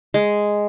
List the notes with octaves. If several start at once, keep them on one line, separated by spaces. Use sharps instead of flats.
G#3